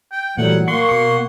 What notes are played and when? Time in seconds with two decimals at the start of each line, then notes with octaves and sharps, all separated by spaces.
0.12 G5
0.38 A#2 E3 F#3 G3 A3 F#5
0.68 A#3 F#5 C6 C#6
0.89 B2 C#6